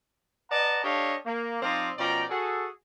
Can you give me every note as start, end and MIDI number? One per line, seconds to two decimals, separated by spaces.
0.51 0.80 71
0.51 0.80 74
0.51 0.80 75
0.51 0.80 78
0.51 0.80 81
0.51 0.80 82
0.83 1.15 62
0.83 1.15 67
0.83 1.15 69
0.83 1.15 73
0.83 1.15 75
0.83 1.15 77
1.26 1.61 58
1.62 1.90 53
1.62 1.90 60
1.62 1.90 63
1.62 1.90 74
1.62 1.90 77
1.62 1.90 84
1.97 2.24 47
1.97 2.24 53
1.97 2.24 61
1.97 2.24 74
1.97 2.24 79
1.97 2.24 82
2.29 2.67 66
2.29 2.67 68
2.29 2.67 69